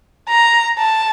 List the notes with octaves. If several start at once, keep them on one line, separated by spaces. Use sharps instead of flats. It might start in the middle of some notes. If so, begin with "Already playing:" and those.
A#5
A5